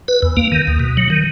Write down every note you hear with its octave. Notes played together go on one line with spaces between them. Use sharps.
B4
E2
A#3
D#3
D#2
B2
F#3
D#3